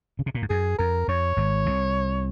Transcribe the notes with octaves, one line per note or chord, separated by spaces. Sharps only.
C#3
C3
A#2
G#2
F#2 G#4
F2 A#4
F2 C#5
G#1 G#2
C2 C3